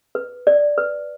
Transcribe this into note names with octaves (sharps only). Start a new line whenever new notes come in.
B4
D5
B4